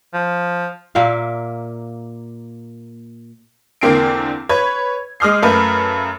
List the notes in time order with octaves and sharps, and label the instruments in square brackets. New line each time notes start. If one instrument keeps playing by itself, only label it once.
[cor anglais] F3
[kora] A#2 A#3 E5 F5
[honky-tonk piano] E2 D3 A#3 C4 C7 D7
B4 C#5 G#6
G#3 D6 D#6 F6 G6 C7
F#2 A3 A#4 B4 F5